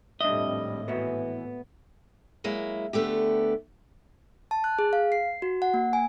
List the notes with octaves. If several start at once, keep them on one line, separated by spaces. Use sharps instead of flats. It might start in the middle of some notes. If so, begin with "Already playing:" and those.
G#1 F2 A2 G3 D4 D#5 E5
E3 B3 F#4 E5
F#3 G#3 A#3 E4
D3 A3 B3 G4
A5
F#6
G#4
F5
C7
F#4
F#5
A#3
G#5